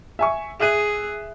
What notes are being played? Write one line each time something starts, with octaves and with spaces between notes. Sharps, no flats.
E5 G#5 C#6
G#4 E5 F#6 D#7